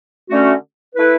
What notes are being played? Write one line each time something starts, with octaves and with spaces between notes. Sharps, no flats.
D3 A3 C#4 F#4
A3 E4 B4